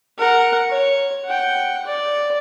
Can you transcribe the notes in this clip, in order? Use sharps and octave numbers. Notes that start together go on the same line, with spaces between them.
A#4 F#5
C#5
F#5 G5
D5